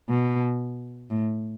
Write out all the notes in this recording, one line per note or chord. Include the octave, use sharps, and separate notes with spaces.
B2
A2